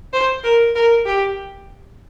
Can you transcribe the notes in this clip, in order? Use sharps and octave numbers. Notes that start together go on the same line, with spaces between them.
C5
A#4
A#4
G4